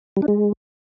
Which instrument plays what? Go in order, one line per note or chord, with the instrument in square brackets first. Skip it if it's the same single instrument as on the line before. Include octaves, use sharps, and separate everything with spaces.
[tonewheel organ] G3
D4
G#3